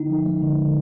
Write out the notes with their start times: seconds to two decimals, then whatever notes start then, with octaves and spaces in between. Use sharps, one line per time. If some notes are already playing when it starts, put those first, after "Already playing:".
Already playing: D3 D#4
0.10 F3
0.26 G#3
0.42 D3
0.59 D3